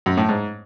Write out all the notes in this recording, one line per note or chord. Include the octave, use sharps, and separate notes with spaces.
F#2
A2
G#2